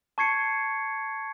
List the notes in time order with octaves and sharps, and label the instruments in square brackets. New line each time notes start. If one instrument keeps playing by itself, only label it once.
[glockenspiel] A5 C#6 G#6 C7 C#7